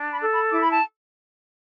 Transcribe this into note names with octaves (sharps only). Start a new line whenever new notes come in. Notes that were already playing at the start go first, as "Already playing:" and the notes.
Already playing: D4
B5
A4
B5
E4 D6
B5
A5